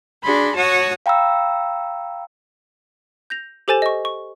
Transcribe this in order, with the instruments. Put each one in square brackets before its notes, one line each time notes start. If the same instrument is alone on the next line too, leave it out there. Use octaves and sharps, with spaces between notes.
[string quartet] D4 F#4 G#4 B5 C6
F#4 C#5 F#5 A5 C#6 D#6
[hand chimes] F5 G5 A#5 B5 E6
[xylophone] G6 A#6 F7
G4 A4 C5 G#5 A6 E7
D#5 C#6
C#6